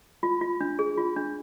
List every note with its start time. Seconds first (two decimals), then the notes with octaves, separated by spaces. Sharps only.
0.23 F4
0.41 F4
0.61 D4
0.79 G#4
0.98 F4
1.16 D4